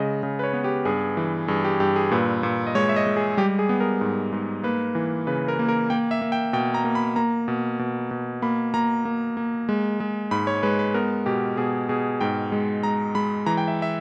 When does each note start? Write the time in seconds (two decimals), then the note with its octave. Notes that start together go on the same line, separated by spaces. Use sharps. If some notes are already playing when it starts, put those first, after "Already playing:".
Already playing: C#3 G#3 D#5
0.23 C#3
0.39 B4
0.44 C#5
0.53 B3
0.64 G4
0.85 G2 G#4
1.17 E3
1.48 G2 G#4
1.64 G4
1.80 G2 G4
1.96 G#4
2.11 A#2 B4
2.43 A#2
2.67 D#5
2.75 G#3 C#5
2.89 E5
2.96 D#5
3.07 G#3
3.17 G#4
3.37 G3 G4
3.59 G#4
3.69 B3
3.80 A#4
4.01 G#2
4.33 G#2
4.63 A#3 B4
4.95 E3
5.27 C#3 B4
5.48 A#4
5.59 A#3
5.69 A#4
5.90 A#3 G5
6.11 E5
6.21 A#3
6.32 G5
6.53 B2 G5
6.74 A#5
6.84 A#3
6.95 B5
7.16 A#3 A#5
7.48 B2
7.79 B2
8.11 B2
8.42 A#3 B5
8.74 A#3 A#5
9.05 A#3
9.37 A#3
9.69 G#3
10.00 G#3
10.31 G#2 B5
10.47 C#5
10.63 G#3 B4
10.79 B4
10.94 B3 A#4
11.26 B2 G4
11.57 B2 G#4
11.89 B2 G#4
12.21 G#2 G5
12.52 G#3
12.83 G#3 A#5
13.15 G#3 B5
13.46 E3 A#5
13.57 G5
13.68 E5
13.82 E5